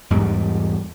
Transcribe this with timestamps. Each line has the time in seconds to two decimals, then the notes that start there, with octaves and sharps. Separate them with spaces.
0.10 E2 G#2 G3 G#3